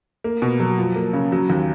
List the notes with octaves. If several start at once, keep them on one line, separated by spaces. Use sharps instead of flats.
A#3
B2
F#3
F3
A#3
C#3
F#3
D#2